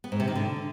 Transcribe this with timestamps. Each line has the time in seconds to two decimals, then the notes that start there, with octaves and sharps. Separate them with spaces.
0.04 B3
0.12 G#2
0.20 C3
0.28 D#3
0.35 D3